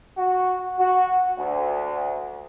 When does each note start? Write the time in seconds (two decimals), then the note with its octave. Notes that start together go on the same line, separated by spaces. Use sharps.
0.18 F#4
0.78 F#4
1.37 D2